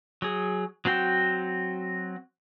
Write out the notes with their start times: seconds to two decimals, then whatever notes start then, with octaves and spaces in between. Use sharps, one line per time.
0.22 F#3 G#4
0.85 F#3 C4 F#4 G5